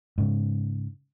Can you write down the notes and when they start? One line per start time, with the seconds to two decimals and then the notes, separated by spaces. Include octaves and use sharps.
0.18 G#2 C#3